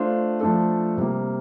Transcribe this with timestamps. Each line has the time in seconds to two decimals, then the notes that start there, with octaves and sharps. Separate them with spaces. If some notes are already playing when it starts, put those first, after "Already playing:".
Already playing: A3 D4 F4 C5
0.41 F3 A3 D4 A4
0.97 C3 G3 A#3